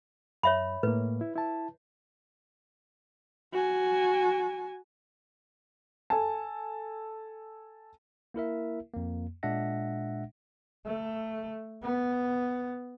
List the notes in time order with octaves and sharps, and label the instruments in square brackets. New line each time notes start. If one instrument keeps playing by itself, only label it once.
[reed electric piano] F#2 [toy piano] C#5 E5 B5
[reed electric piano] A2 A#3 [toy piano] B4
[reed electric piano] E4
E4 A5
[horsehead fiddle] F#4 G#5
[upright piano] A4 G#5 A5
[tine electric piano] A#3 E4 A#4 E5
F2 A#3
A#2 G#3 D4 E5 F#5 A#6
[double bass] A3
B3